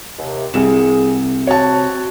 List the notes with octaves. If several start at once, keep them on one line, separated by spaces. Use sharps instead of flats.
D#2 C3
C2 C3 G#4 E7
C4 F#4 C#5 A5